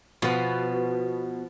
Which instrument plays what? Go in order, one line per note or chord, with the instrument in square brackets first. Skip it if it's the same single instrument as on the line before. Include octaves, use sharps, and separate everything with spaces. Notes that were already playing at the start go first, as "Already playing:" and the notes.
[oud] B2 [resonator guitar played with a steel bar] F3 B3